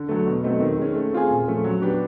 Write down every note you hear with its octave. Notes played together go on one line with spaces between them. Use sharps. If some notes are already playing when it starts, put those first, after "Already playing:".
Already playing: D3
F#3 A3
B2
F#3 A3 C4 D#4
D#3
G#3 C#4
A3
C4 F4 G#4
A#2
F3 A3 C#4
F#3
B3 D4 G4